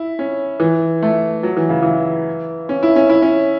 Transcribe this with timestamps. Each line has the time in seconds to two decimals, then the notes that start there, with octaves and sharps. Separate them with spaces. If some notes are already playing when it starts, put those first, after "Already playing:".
Already playing: E4
0.19 C#4
0.60 E3
1.02 A3
1.43 F#3
1.57 E3
1.69 C#3
1.82 E3
2.69 C#4
2.83 E4
2.96 C#4
3.09 E4
3.22 C#4